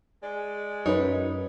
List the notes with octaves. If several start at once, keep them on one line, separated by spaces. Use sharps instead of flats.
G#3 D5
F#2 D#4 B4 C#5